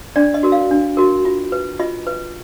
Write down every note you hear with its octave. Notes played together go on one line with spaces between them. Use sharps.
D4 D5
D#5
F#4 A#4
F5
D4
F#4 A#4
F4
B4
F4 D#5
B4